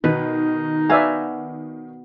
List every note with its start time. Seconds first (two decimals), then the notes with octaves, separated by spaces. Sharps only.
0.04 B2 D#3 D#4 B4
0.89 B3 F#4 D5 E5 F5 G#5